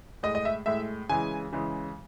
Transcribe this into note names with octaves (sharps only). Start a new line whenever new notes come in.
A2 G#3 D#5
D#5
E5
A2 G#3 E5
C#3 E3 G#3 G#5
C#3 E3 G#3